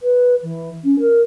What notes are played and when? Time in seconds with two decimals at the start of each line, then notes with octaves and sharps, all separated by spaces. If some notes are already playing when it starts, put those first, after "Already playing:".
0.02 B4
0.43 E3
0.84 C#4
1.00 A#4